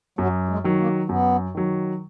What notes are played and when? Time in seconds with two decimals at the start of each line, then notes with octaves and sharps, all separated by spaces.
0.18 F#2 F#3
0.49 G#3
0.64 D#3 F#3
0.79 A#3
1.09 F#2 B3
1.55 D#3 F#3